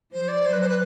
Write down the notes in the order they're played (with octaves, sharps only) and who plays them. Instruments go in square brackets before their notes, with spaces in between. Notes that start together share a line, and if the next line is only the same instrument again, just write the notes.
[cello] F3 [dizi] C5
[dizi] D5
[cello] F#3 [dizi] C5
[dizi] B4
C5
B4